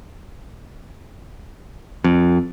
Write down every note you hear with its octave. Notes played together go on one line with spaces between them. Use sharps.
F2